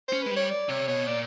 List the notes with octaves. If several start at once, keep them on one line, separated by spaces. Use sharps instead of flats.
C#4 C5
G#3 B4
G3
C#5
D5
C3 C#5
B2 C#5
A#2 D5